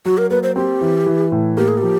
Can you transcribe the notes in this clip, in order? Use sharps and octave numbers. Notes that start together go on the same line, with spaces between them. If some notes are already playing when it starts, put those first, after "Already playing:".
F#3 F#4
A#4
A#3 B4
C5
C4 G4
E3
E3
A2
A#3 G4
G#4
F3 G4